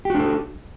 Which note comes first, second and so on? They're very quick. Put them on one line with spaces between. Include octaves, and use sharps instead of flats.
G4 F#4 D4 A4